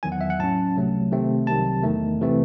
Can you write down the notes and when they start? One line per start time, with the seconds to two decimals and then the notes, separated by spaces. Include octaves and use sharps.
0.03 E2 D#3 F#3 G#5
0.12 F#5
0.21 E5
0.30 F#5
0.39 A2 F#3 C#4 A5
0.75 C2 C3 F#3 A3
1.12 C3 D#3 A3 C4
1.47 C2 C3 D#3 F#3 A5
1.83 E2 D#3 A3
2.20 C2 C3 E3 A3 C4